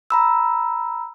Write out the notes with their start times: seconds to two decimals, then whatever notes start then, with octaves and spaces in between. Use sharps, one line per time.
0.10 A#5 B5 E6